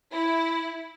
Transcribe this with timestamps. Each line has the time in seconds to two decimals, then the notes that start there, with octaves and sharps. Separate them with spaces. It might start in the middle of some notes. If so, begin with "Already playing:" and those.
0.12 E4